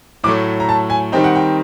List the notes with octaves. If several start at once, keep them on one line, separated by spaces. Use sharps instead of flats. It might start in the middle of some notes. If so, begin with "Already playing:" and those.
A2 F#3 A3 D6
A#5
A5
G#5
D#3 G3 C4 D#4 G5
F#5
G5